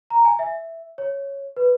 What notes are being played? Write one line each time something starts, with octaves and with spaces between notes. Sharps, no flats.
A#5
G#5
E5
C#5
B4